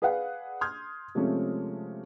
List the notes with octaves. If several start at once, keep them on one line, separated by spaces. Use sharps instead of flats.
G#4 B4 D5 F5 F#5
C6 D#6 F6 G6 G#6
C3 F3 G#3 A3 C4 C#4